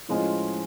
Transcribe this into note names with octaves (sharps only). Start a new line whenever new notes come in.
A2 F3 G#3 C#4 F4